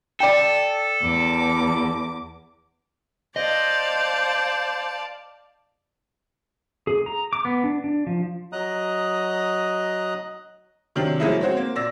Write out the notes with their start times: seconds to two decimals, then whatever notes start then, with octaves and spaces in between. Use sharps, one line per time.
0.20 A4 D5 G5
1.01 E2 D6
3.36 C5 D5 D#5 F5 A5
6.87 G#4
7.06 A#5
7.33 D6
7.45 B3
7.64 D4
7.84 D4
8.07 F3
8.52 F#3 D#5 A#5 D#6 F#6
10.96 C3 D#3 F#3 D4 F#7
11.20 F3 F#3 G#3 A#3 D#4 E4
11.41 C4 F#4 C5 C#5
11.57 A#3
11.75 A#2 D5 E6 A#6